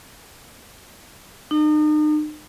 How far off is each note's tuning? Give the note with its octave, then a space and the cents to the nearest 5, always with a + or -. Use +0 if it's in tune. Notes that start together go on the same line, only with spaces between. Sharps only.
D#4 -40